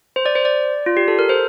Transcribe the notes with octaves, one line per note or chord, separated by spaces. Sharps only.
C5
D5
C5
D5
F4
G4
A4
A#4
C5